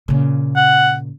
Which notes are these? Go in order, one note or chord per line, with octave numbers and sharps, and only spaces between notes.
A#2 C#3
F#5